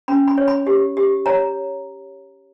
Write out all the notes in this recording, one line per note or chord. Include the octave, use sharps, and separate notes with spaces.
C#4 B5
B5
C#5
B5
G4
G4
C#5 A#5